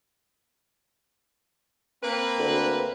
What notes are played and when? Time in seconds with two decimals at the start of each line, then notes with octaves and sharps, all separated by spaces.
2.03 A#3 C4 B4
2.39 D2